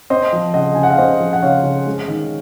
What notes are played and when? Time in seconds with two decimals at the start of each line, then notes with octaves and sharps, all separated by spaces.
0.10 C4 C5 D#5
0.33 F3
0.54 C#3 D#5 F#5
0.75 C#3 G#5
0.83 F#5
0.91 F5
0.99 C4 C5 D#5
1.20 F3
1.33 F#5
1.42 C#3 C#5 F5
1.64 C#3
1.86 G#3
2.08 D#3